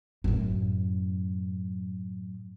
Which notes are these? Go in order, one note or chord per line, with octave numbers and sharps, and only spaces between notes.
F#2 A2